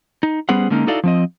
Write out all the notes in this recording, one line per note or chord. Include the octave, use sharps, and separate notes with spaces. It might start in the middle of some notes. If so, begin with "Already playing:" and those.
D#4
G3 B3 C#4 G#4 C5 F#5
D3 G#3 A#3 C#4 D#4
D#4 E4 F#4 A4 D5 F5
F3 C4 D#5